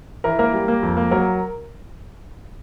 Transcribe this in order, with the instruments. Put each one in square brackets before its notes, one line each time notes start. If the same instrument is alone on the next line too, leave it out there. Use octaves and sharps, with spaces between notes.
[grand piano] E3 A#4
A#3 A#4
G3
A#3
F2
A#3
F#3 A#4